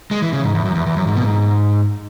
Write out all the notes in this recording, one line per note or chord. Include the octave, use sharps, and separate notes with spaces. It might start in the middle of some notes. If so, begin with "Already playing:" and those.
G#3
E3
C#3
G#2
E2
F#2
E2
E2
F#2
G#2
B2
G#2